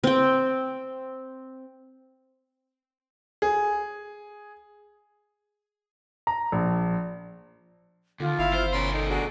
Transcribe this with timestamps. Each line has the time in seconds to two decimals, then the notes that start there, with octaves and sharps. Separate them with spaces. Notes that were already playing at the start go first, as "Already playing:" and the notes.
0.04 C4 G5
3.42 G#4
6.27 A#5
6.52 A#1
8.20 D#2 D3 F4
8.39 G1 E4 F5
8.54 C5
8.73 B2 C#4 A#4 B5 C6
8.93 D#4 A4
9.10 D4 F#4 G#4